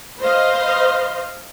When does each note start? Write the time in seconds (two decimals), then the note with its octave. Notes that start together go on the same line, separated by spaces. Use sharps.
0.19 B4 C5 D#5 F5 C6